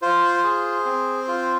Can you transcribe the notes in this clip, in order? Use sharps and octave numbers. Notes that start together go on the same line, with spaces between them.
F4 C5
G#4
C4
F4